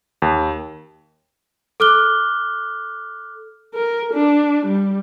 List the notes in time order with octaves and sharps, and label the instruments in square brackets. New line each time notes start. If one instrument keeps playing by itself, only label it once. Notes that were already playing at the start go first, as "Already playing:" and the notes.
[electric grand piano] D#2
[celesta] A4 D6 F6 F#6 G7
[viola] A#4
D4
G3